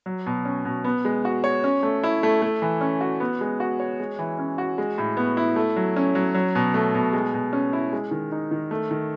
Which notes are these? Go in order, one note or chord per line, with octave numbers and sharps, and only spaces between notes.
F#3
B2
C#4
B2
B3
G#3
F#4
C#5
C#4
A3
E4
A3
A3
E3
C#4
F#4
B3
G#3
F#4
C#5
G#3
E3
C#4
F#4
G#3
A2
B3
E4
A3
F#3
C#4
F#3
F#3
B2
A3
B2
G#3
B2
C#4
E4
G#3
D#3
D#4
D#3
A3
D#3